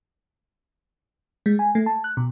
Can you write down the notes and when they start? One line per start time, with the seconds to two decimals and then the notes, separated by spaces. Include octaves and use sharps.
1.46 G#3
1.59 G#5
1.75 A3
1.86 A5
2.04 F#6
2.17 B2